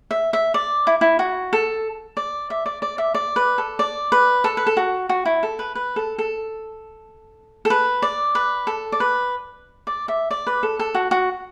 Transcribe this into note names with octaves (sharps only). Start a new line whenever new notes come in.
E5
E5
D5
E4
E4
F#4
A4
D5
E5
D5
D5
E5
D5
B4
A4
D5
B4
A4
B4
A4
F#4
F#4
E4
A4
B4
B4
A4
A4
A4
B4
D5
B4
A4
D5
B4
D5
E5
D5
B4
A4
A4
F#4
F#4